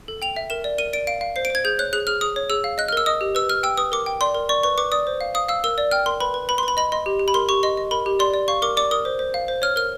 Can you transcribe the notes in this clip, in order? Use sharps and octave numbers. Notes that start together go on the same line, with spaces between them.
A4
G5 F7
E5
A#4 E7
D5
A#4 D#7
D5 D7
F5 D7
F5
C5 C7
D7
C5 G#6
G#4 G6
C#5 F#6
G#4 F#6
G#4 F6
G#4 D#6
C#5
G#4 E6
F5
D#5 F#6
F6
A#4 E6
D#5 D#6
G4
B4 E6
B4 F6
G5 E6
B4 D#6
A#4 D6
G5
D5 C6
A#4
D5 C#6
B4 C#6
B4 D6
D5 D#6
C5
F5
F5 D#6
F5 E6
A#4 E6
D5
G5 F6
A#4 C6
B4 B5
B4
B4 B5
C6
B4 B5
D#5 B5
D#5 C6
G4
G4
B5
A#4 C6
G4 C#6
D#5 C6
D#5
A#4 B5
G4
D5 C6
D5
F5 C#6
A#4 D6
D5 D6
A#4 D#6
C5
C5
F5
C5
C#5 F6
A#4 F6